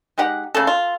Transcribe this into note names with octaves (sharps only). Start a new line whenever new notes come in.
G#3 D#4 G4 F#5
C#3 A3 A4
F4